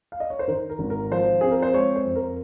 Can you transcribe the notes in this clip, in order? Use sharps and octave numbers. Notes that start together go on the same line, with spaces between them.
F5
D#5
C#5
C5
D#3 A#4
A#4
G#1
A#4
F3 C5
C4 G#4
A#4
C5
G#3 C#5
C5
F2
A#4